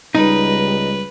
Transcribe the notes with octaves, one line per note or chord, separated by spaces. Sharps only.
C#2 G3 D#4 B4